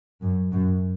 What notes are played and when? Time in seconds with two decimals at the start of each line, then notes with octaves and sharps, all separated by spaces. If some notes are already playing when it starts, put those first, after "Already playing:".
0.23 F#2
0.52 F#2